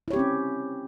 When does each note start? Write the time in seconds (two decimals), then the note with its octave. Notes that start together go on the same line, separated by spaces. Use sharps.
0.08 E4
0.11 C#5
0.13 G4
0.16 C4
0.19 C#4